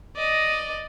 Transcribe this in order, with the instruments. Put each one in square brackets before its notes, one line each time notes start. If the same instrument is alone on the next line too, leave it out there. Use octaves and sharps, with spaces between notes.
[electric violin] D5 [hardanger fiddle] D#5